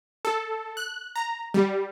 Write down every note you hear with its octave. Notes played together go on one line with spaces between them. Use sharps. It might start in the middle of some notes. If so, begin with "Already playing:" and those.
A4
F#6
A#5
G3